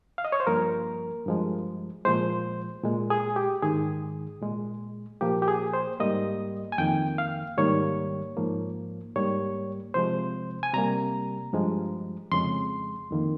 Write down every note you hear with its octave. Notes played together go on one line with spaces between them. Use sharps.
F5
D#5
C#5
C5
G2 F3 A#3 A#4
G2 F3 G#3
A#2 F3 G#3 C5
A#2 G#3
G#4
G4
G#2 D#3 G#3 G#4
A#2 G#3
A#2 F3 A#3 G4
G4
G#4
C5
G#2 G3 A#3 D#5
G#5
F2 D#3 A#3 G5
F5
G#2 D#3 G3 A#3 C#5
G#2 F3 A#3
G#2 G3 A#3 C#5
C3 F3 G#3 C5
G#5
C3 G3 A#3 A#5
G2 F3 G#3
F2 C#3 G#3 C6
F2 D#3 A#3